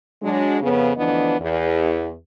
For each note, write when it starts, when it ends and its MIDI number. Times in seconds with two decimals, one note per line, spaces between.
0.23 0.57 54
0.23 0.57 56
0.23 0.57 62
0.62 0.91 41
0.62 0.91 49
0.62 0.91 59
0.97 1.34 38
0.97 1.34 52
0.97 1.34 53
0.97 1.34 59
0.97 1.34 62
0.97 1.34 75
1.40 2.12 40